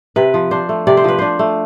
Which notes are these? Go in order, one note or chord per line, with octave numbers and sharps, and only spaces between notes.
C3 B4
F3
D4 C5
A3
C3 D5
C5
F3 B4
D4 C5
A3